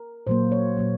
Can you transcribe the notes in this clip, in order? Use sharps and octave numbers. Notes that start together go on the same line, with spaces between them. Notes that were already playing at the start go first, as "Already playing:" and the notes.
Already playing: A#4
A#2 F#3 A#3 C5
C#5
A#2 F#3 A#3